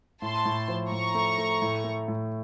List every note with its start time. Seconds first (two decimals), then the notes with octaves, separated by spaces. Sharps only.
0.22 A2 A5 C6
0.46 A2
0.68 F3
0.91 A2 A#5 C#6
1.15 A3
1.38 A3
1.62 A2
1.84 A3
2.08 A2